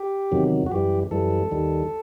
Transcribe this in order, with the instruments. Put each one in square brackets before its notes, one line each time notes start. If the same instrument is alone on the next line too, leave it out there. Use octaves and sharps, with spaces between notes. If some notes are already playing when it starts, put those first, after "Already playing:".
Already playing: [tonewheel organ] G4
E2 C3 D#3 F#3
F#4
F#2 E3 G3 G4
F#2 E3 G3 A4
D#2 D#3 G3